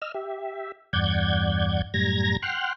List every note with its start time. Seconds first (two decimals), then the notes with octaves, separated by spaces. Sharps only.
0.02 D#5 E6 F6
0.14 G4 E5
0.93 E2 G2 D5 F#5 G6 G#6
1.94 F#2 A2 G3 A#5 G#6 A#6
2.42 F#5 G5 C6 F6 F#6